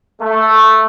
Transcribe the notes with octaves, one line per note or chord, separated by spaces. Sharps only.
A3